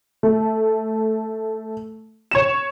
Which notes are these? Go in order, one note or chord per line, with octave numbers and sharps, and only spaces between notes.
A3
C#5 E7